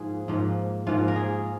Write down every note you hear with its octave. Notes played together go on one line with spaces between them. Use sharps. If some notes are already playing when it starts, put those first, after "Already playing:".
Already playing: G#2 F3 A#3 G#4
G#2 F3 A#3
G#2 F3 A#3 F4
A#4
G#4